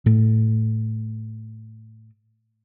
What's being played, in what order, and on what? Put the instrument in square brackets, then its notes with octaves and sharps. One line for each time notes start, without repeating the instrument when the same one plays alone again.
[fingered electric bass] A2 A3